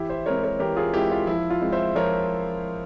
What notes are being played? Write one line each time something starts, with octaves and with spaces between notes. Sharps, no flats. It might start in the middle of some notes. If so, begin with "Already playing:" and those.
Already playing: E3 E4 G4
C5 E5
G#3 C4 A#4 C#5
A#4 C#5
E3 G4 A#4
F4 G#4
G#3 C4 E4 G4
F4
F3 E4
F4
G#3 C4
C5 E5
F3 A#4 C#5